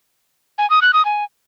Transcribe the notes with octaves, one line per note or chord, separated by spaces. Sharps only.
G#5
D#6
F#6
D#6
G#5